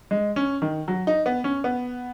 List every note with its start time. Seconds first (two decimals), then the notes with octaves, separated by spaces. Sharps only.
0.11 G#3
0.36 C#4
0.62 D#3
0.88 F#3
1.07 D#4
1.26 B3
1.44 C#4
1.64 B3